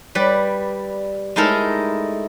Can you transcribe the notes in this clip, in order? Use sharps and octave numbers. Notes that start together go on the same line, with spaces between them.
G3 B4 D5
G#3 A3 D#4 E4 A4 A#4